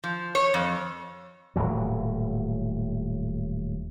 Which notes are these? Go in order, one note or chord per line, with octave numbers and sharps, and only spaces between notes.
F3
C#5
F2
D#1 A2 E3 F#3